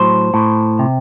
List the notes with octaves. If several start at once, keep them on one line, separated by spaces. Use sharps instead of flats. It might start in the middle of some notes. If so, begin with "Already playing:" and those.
Already playing: A2 F#3 C5
A2
C3